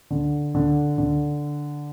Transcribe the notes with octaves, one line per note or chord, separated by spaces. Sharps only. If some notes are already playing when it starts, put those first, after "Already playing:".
D3
D3
D3